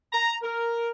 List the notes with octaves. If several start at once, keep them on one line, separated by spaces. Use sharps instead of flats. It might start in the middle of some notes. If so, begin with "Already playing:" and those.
A#5
A#4